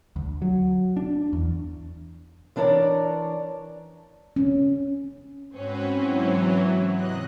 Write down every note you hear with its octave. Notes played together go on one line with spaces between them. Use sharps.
D2
F#3
D4
E2
E3 D4 A#4 C#5 D5
C#4
G#2 C4 C#4 F#4 B4
E3 F#3
C3 D#5 F#6